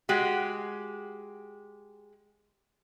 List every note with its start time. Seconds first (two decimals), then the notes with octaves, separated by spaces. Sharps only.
0.09 G#3 F#4 G4